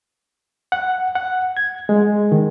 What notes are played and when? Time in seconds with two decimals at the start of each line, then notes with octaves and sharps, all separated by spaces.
0.72 F#5
1.15 F#5
1.57 G#6
1.89 G#3
2.32 D#3